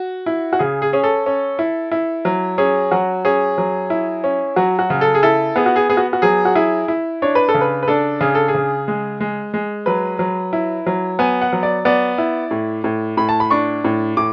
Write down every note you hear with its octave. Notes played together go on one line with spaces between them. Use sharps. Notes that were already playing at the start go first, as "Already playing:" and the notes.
Already playing: F#4
E4
F#4
C#3 G#4
G#4
C#4 G#4
A4
C#4
E4
E4
F#3
C#4 G#4
F#3 F#4
C#4 G#4
F#3
E4
C#4
F#3 F#4
F#4
C#3
A4
G#4
E4 A4
B3 G#4
F#4
G#4
B3 G#4
F#4
F#4
F#3 G#4
F#4
E4 G#4
E4
D4 C#5
B4
A4
C#3
B4
B4
D4 A4
C#3 G#4
A4
G#4
C#3
G#3
G#3
G#3
F#3 B4
F#3
E4
F#3
B3 G#5
F#5
F#3
D5
B3 D5
E4
A2
A2
A2 B5
A5
B5
D4 C#6
A2
A2 D6